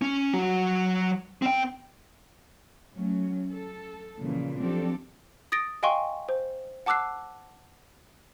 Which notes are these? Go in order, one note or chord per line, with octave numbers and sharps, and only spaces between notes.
C#4
F#3 F#4
C4 G5
F#3 A3 C#4
A4
A#2 C#3 E3 F3
F3 F#3 C4 D4 G4 A4
D#6 A6 A#6 D7
D#5 F5 G5 G#5 C6 C#6
C5
F#5 A5 D6 E6 F#6 C7